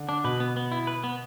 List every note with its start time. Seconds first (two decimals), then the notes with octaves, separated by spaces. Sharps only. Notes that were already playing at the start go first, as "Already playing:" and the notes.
Already playing: D3
0.09 D4
0.24 B2 B4
0.40 B3
0.57 B3
0.72 E4
0.87 B4
1.04 B3